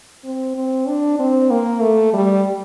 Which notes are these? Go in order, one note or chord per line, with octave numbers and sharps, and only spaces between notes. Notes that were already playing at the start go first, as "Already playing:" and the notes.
C4
C4
D4
C4
A#3
A3
G3